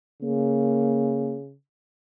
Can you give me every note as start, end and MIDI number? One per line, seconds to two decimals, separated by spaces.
0.23 1.55 49
0.23 1.35 58